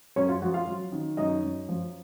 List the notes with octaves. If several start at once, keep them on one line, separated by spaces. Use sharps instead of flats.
F#2 C#4 C#5
F4 F5
F3 F#4 F#5
F4 F5
F#3
D#3
F#2 D#4 D#5
F#2
F3